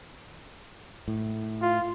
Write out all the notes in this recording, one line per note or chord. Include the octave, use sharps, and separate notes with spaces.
A2
F4